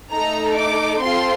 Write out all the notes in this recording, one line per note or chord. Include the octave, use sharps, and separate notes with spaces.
A3 D#4 A4 A#5
D6
C4 F4 A4 C6